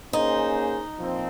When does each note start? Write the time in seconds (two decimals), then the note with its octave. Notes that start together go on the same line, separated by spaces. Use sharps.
0.13 A#3 C#4 D#4 G#4 C5
0.98 A#2 F3 C4